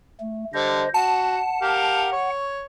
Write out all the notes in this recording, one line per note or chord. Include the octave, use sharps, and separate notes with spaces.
A3
D3 G3 C5 D#5
F#4 F#5 A5
G4 A#4 F5
C#5